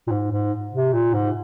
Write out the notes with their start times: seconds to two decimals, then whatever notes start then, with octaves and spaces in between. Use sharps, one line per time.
0.08 A#2
0.11 G#2
0.32 G#2
0.74 C3
0.93 A#2
1.14 G#2